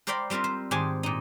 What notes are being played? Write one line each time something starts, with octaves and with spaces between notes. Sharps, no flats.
A#4 C5 D5 F5 G5 B5
G3 C4 F4 A#4 E5
C5
G#2 D#3 G4 C5 G#5 A5
A#2 D#4